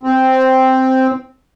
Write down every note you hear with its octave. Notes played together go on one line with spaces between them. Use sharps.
C4